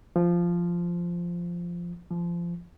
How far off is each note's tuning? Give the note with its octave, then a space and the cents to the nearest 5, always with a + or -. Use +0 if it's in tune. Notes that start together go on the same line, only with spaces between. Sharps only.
F3 -10
F3 -25